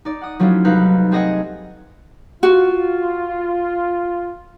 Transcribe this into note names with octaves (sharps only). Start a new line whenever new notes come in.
D#4 D5
F#5 D#6
F3 F#3 A3 C#4 E4 F4
C2 D#4 B4 F5 F#6 G6
A3 C4 G#4 D#5 F#5 G#5
F4 F#4